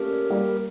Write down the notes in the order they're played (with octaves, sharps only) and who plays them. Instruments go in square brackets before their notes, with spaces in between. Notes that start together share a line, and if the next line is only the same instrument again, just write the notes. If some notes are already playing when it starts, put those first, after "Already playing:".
Already playing: [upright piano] A3 A#3 C#4 [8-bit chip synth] G4 A#4
[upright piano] G3 A#3